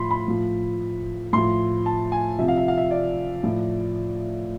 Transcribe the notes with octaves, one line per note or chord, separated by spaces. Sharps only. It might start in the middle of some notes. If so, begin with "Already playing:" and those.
Already playing: A2 F3 B5 C6
B5
A2 F3
A2 F3 C6
A5
G#5
C3 F3 E5
F5
E5
F5
E5
D5
A2 F3